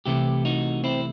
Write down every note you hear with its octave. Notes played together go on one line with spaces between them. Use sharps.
C2 C3 E3 A3 E4 G4
D#4 F#4
C4 E4